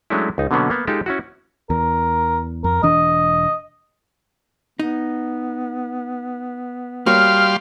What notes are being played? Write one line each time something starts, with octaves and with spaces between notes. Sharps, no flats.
F#3 G#3 A3 C#4 D4 E4
C#2 D#4
B2 D3 F#3 A#3 B3 C#4
A#3 B3
G#3 D#4 F4 G4 A4
C#4 E4 F#4
E2 A#4
F2 A#4
E1 E3 D4 D#5
B3 D#4
G3 A#3 F#4 C#5 F5 C6 F6